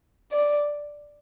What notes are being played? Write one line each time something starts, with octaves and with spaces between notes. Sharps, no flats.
D5